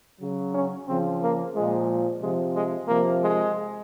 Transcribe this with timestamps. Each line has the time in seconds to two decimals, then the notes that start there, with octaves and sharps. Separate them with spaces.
0.20 C#3 F#3
0.54 C#4
0.87 C#3 F3 C4
1.21 A#3
1.54 A#2 F3 G#3
2.21 C3 F3 G#3
2.55 G#3
2.88 C3 F3 A#3
3.21 G#3